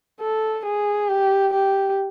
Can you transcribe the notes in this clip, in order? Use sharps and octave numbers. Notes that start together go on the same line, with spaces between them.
A4
G#4
G4
G4